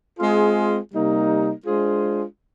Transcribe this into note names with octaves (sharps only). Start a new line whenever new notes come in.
G#3 C4 F4 G#4
C3 G3 A#3 D#4
G#3 D4 F4 G#4 C5